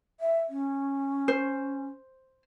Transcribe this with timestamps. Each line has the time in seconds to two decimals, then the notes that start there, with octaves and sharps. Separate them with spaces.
0.20 E5
0.49 C#4
1.28 C5